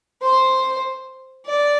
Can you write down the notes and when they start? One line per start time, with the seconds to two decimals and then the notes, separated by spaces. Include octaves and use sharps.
0.22 C5
1.46 D5